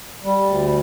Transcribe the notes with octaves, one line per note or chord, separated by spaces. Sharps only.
G3
D2